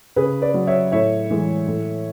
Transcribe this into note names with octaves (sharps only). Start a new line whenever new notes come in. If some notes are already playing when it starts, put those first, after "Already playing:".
C#3 G#4 B4
B4 D5
F#3
C#5 E5
A2 C#5 E5
E3 G#3
A2